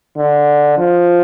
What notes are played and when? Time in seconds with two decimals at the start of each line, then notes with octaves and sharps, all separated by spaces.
0.17 D3
0.77 F3